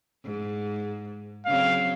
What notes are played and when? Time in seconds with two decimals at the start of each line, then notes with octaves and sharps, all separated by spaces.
0.24 G#2
1.46 C#3 F#3 C4 F5